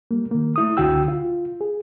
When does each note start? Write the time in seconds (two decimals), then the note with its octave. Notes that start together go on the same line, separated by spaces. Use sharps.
0.11 G3 A#3
0.31 D#3 A#3
0.56 A3 E4 D#6
0.77 C#2 D3 F#4 G5 E6
1.08 F4
1.61 G#4